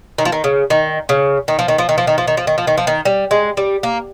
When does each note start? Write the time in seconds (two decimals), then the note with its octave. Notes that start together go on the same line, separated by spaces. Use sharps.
0.18 D#3
0.25 F3
0.32 D#3
0.44 C#3
0.70 D#3
1.09 C#3
1.48 D#3
1.59 F3
1.68 D#3
1.78 F3
1.89 D#3
1.98 F3
2.07 D#3
2.18 F3
2.28 D#3
2.37 F3
2.47 D#3
2.58 F3
2.67 D#3
2.78 F3
2.87 D#3
3.05 G3
3.31 G#3
3.57 G3
3.83 A#3